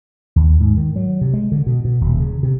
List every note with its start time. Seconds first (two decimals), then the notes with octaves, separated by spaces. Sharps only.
0.36 D#2
0.60 G#2
0.77 D#3
0.96 F#3
1.21 C3
1.34 G#3
1.52 D3
1.66 B2
1.85 B2
2.01 D#1
2.20 C#3
2.43 C3